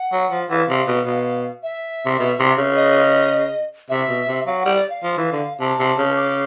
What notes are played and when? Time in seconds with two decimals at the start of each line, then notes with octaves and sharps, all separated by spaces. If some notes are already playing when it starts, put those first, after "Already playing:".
Already playing: F#5
0.12 F#3
0.31 F3
0.49 E3 F5 F#5
0.69 C3
0.87 B2
1.06 B2
1.63 E5
2.05 C3
2.19 B2
2.39 C3
2.58 C#3
2.76 D#5
3.90 C3 E5
4.09 B2
4.28 C3
4.47 F#3 F5
4.61 G3 F#5
4.75 D5
4.90 F5
5.03 F3
5.17 E3
5.33 D3
5.60 C3 A5
5.79 C3
5.98 C#3
6.16 D6